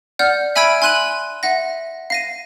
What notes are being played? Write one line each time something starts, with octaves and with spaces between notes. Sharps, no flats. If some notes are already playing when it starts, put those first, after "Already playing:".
D5 F#5 F6 G6
E5 G#5 B5 E6 G#6 D7
G#5 C6 F#6 D#7 F#7
E5 F#5 A#6
F5 A#6 D#7